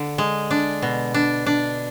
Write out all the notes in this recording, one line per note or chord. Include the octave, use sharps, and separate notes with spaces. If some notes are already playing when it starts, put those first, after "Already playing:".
Already playing: D3
G#3
D4
B2
D4
D4